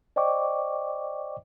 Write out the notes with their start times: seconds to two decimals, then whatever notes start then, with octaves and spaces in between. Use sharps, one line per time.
0.16 C5 D5 D#5 G5 C#6 D6